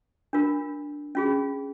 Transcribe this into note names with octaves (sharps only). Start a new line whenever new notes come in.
D4 F4 A#4
C#4 F4 G#4